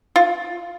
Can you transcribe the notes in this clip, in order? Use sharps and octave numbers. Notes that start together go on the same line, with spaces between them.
F4